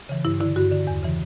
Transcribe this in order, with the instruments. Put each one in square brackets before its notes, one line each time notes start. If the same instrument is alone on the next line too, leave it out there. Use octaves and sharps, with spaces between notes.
[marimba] C#3 E3
G2 E4
D3 E4
G2 F#4
D3
E2
C#3 E3